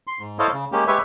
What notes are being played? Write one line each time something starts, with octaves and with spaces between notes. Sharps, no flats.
C6
G#2
E4 A4 C5 C#5 D#5 F5
C#3
G#3 A#3 C#4 G4
G#3 G4 B4 C#5 E5